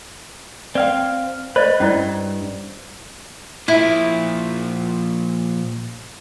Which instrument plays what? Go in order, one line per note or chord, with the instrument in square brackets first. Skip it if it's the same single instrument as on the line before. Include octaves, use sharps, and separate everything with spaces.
[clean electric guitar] C4 F5 [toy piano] D5 G5
[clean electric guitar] B4 [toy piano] C5 D5 D#5
[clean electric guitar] G2 [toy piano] C#4 E4 D5
[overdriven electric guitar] A#2 F3 [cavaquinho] E4